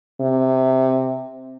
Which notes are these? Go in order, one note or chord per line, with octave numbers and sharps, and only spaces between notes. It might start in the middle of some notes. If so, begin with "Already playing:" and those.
C3